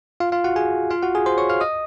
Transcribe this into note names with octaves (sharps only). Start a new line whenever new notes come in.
F4 F5
F4 F5
F#4 F#5
G#4 G#5
F4 F5
F#4 F#5
G#4 G#5
C5 C6
C#5 C#6
F5 F6
D#5 D#6